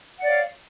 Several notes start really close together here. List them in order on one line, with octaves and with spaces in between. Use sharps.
F#5 D5 C#5 F5